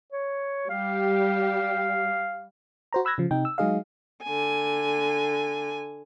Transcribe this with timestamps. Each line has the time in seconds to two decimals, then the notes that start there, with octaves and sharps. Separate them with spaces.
0.12 C#5
0.69 G3 G4 F5
2.93 F#4 C5 A#5
3.05 B5 E6 F#6 G#6 A#6
3.18 C#3 F3
3.31 C3 D#4 G5
3.45 E6
3.58 F#3 G#3 D#4 G#4 D#5 F5
4.24 D3 G#5